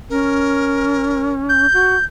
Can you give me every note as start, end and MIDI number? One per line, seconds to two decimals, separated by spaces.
0.10 1.66 61
0.10 1.32 70
1.49 2.05 91
1.73 1.96 66